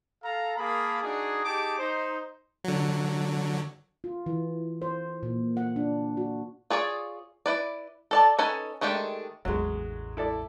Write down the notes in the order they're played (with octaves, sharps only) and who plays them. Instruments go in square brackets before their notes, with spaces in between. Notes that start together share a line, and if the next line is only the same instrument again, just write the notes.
[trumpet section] A4 F5 A#5
A#3 G#4 A#4 F5 A5 B5
D4 D#4 F#4 G#4
D#4 G4 G#4 A5 D6
D#4 C5
[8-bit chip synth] D3 F#3
[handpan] F4
E3
C5
A#2
F#5
D4
F#4
[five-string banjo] F4 G#4 C#5 D5
E4 B4 D5
A4 D5 A5
C#4 D#4 A4 B4 G#5
D#3 G#3 A3 D4 G4
[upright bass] A1 E2 [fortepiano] F#3 G#3
[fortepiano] E4 A4 D5